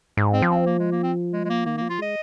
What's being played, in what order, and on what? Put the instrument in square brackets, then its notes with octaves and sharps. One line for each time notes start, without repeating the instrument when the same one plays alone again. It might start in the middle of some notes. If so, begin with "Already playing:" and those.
[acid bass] G#2
[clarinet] C4
[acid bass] F3
[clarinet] C4
A#3
G#3
A#3
C4
G#3
G#3
A#3
[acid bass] D#3 [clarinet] A#3
[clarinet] A#3
[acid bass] F3
[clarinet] F4
[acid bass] G#3 [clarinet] D#5